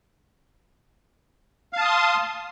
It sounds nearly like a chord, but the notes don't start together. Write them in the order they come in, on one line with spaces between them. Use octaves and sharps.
F5 A5 D#6 C6